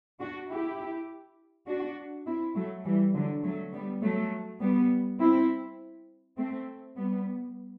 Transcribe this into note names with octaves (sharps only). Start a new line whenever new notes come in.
D4 F#4
E4 G4
D4 F#4
C4 E4
F#3 A3
E3 G3
D3 F#3
F#3 A3
G3 B3
F#3 A3
G3 B3
C4 E4
A3 C4
G3 B3